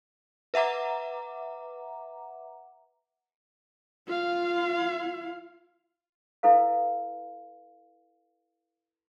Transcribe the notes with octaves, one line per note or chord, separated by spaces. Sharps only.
B4 E5 F#5 A#5 D6
F4 F5
E4 A4 B4 F5